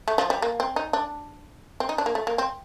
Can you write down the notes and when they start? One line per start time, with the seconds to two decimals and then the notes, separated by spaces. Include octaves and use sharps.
0.08 A3
0.18 F3
0.30 G3
0.42 A#3
0.60 C4
0.76 D#4
0.93 D4
1.80 C4
1.89 D#4
1.98 D4
2.06 A#3
2.15 A3
2.27 A#3
2.38 C4